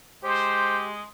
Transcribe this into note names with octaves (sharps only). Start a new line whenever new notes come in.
G#3 G4 C5